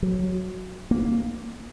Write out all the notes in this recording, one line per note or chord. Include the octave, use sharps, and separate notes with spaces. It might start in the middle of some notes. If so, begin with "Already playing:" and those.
F#3
A#3